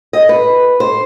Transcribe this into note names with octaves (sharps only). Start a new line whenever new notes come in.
D#5
B4
C5